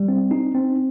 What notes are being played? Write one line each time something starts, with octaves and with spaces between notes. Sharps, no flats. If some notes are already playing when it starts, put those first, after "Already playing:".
Already playing: G3
C4
D#4
C4